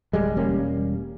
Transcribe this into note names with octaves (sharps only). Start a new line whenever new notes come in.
D1 G3 G#3
E1 G3 A#3 C#4